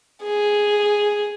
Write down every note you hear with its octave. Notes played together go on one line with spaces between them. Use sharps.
G#4